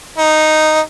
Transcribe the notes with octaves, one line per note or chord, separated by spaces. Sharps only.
D#4